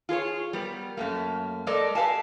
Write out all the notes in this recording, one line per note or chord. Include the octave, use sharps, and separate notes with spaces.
F4 G#4 B4 C#5
G3 B3 A#4
F#2 A3 A#3
G#3 A3 A4 A#4 D5 D#5
G4 A4 B4 F5 G#5 A5